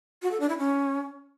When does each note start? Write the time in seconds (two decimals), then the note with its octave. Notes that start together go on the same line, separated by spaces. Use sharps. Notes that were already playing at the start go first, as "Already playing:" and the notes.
0.22 F#4
0.31 A4
0.40 D4
0.49 E4
0.58 C#4